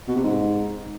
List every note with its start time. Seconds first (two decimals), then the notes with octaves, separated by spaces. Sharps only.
0.08 B2
0.16 C3
0.24 G#2